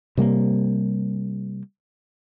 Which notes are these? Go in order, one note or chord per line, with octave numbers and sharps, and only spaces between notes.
C3 G3 A#3